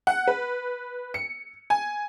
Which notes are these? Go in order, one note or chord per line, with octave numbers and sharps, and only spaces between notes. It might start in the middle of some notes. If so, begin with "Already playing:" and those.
F#5
B4
C#7
G#5